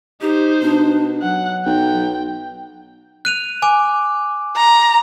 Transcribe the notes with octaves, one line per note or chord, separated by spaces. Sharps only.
D#4 G4 C5
B2 D4
F#3 F#5
B1 G5
F#6 D#7 F7
G#5 D6
A#5